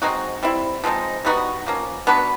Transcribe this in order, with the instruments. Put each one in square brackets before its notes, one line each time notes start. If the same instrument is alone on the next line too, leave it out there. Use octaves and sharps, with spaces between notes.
[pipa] G#3 C4 D#4 F#4
G3 C4 E4
F3 G#3 C4 D#4
G3 B3 D#4 F#4
F3 A#3 C#4
B3 D4 F#4 B4